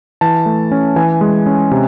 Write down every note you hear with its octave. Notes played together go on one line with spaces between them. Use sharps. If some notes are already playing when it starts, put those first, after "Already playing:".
E3 A5
A3
C#4
E3 G#5
G#3
C#4
C3